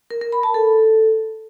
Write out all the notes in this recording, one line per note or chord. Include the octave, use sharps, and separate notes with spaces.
A#4
A#4
B5
A5
A4